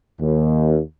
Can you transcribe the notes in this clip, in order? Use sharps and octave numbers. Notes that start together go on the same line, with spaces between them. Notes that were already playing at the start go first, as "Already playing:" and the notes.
D#2